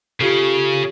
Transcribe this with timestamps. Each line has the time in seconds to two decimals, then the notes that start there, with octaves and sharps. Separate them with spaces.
0.21 C#3 F4 G4 A4